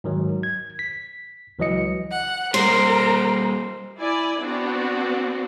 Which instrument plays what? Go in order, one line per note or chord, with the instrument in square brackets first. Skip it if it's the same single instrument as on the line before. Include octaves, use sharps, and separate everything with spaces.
[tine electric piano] G#2 D#3 F#3
G#6
B6
C#2 E3 F#3 D#5 C#7
[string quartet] F#5
[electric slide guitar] G3 A#3 [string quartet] A#4 [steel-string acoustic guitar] C5
[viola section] E4 D5 G#5
B3 C4 D4 F#4